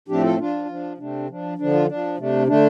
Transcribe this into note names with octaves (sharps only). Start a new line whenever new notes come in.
A2 F3 A3 C4 D4 G4
F4 A4
F3 D4 F4
F3 D4
C3 A3 C4 D4
F3 D4
D3 F3 D4
F4
F3 D4
C3 A3 D4
D3 A3 D4